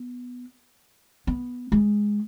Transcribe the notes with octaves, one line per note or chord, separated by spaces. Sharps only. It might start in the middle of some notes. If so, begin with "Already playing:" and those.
Already playing: B3
B3
G#3